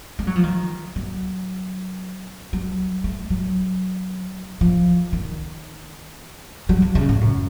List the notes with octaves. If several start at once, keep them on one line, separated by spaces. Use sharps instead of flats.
A3
F#3
F3
D#3
F#3
F#3
A3
F#3
F3
D#3
F#3
F3
C#3
A2
F#2